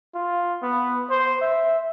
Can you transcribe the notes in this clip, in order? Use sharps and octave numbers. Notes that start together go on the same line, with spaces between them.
F4
B3
C5
E5